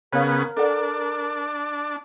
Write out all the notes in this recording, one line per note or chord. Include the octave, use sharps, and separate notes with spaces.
C#3 B3 A#4 C#5 F5
D4 A4 D5 F#5